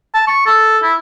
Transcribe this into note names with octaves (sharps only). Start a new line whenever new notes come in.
A5
C#6
A4
E4